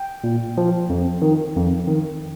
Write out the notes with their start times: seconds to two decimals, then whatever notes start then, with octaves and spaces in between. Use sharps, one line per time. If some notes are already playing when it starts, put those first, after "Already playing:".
Already playing: G5
0.24 A#2
0.58 F3
0.90 F2
1.22 D#3
1.56 F2
1.87 D#3